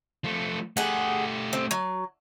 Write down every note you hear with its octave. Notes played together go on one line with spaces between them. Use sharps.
F3 A3
A3 G4 G#4 F#5
C4
F#3